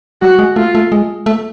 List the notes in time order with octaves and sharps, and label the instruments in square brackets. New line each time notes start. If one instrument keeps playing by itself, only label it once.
[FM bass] G3 [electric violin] F#4
[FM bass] G#3
[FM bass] A3 [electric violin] F4
[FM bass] A3
G#3
A3